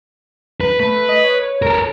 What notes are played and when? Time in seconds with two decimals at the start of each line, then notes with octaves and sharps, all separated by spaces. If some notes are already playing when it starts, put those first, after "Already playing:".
0.61 B4
0.80 A3 B4
1.09 D#5
1.24 C#5
1.62 A4 A#4